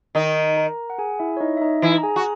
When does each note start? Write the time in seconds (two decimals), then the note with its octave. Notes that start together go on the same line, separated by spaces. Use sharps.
0.15 D#3 D#4 A#4 A#5
0.57 A#4 A#5
0.90 F#5
0.98 G#4 G#5
1.19 E4 E5
1.37 C#5
1.41 D#4 D#5
1.57 E5
1.61 D#4 D#5
1.82 E3 E4
1.98 A#5
2.03 G#4 G#5
2.16 F#4